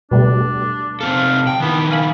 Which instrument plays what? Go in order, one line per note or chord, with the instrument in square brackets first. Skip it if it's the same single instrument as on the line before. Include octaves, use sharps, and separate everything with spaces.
[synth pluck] B2 G3 A3 [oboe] D4
[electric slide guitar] C3 C4 A4 [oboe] F5
[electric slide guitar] G5
[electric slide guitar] D#3 E4 [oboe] B3
[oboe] A#4 [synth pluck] F5 G#5 B5